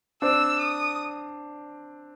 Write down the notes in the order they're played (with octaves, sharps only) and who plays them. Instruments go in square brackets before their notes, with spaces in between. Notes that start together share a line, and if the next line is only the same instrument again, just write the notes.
[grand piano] C4 D4 [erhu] E6
[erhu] D#6